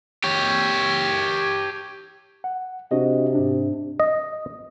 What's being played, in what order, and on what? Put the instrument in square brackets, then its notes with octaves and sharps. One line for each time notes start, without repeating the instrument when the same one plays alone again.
[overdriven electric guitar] G4 C#5
[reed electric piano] F#5
[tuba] C3 [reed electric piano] D4 F#4 D#5
[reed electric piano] G#2 D4
[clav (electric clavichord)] D#5